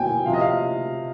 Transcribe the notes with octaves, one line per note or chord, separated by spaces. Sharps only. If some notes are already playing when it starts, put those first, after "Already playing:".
Already playing: B2 G5 G#5
C3 F3 F5
D#5
F5